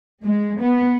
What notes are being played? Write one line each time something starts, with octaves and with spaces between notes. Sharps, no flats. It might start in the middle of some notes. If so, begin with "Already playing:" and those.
G#3
B3